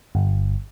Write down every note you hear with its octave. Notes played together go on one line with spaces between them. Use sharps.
G1